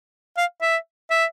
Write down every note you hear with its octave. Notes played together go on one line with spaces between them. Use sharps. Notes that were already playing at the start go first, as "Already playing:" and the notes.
F5
E5
E5